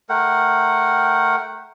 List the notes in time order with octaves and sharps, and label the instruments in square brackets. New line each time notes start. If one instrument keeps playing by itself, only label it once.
[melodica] A3 A#4 F#5 G5